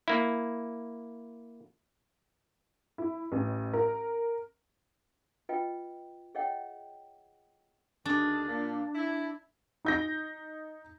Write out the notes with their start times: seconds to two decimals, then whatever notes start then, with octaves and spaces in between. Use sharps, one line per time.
0.08 A#3 E4
2.98 E4
3.32 A1
3.73 A#4
5.49 F4 B4 D#5 G5
6.35 G#4 C#5 D#5 F#5 G5
8.05 D2 D#3 D4 G#4
8.48 A#2
8.95 E4
9.85 D#4 G6 A#6